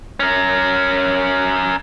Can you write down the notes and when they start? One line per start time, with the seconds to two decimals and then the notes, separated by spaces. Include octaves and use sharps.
0.20 C#4 A#4